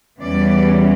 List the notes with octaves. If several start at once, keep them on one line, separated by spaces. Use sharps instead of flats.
E2 E3 G3 C#4 D5